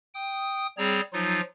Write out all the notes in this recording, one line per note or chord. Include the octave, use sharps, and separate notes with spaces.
G5 D#6
G3 C4 G#4 C#5 A#5
F3 F#3 D#4 F4